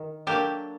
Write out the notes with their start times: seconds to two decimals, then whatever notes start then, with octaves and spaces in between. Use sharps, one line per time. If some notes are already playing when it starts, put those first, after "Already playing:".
Already playing: D#3
0.27 F#3 A#3 D4 G4 A4